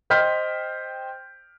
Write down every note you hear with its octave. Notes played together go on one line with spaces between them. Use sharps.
C5 D#5 G5 F6 G6 B6